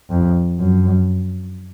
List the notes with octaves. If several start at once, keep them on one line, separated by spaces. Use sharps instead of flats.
F2
F#2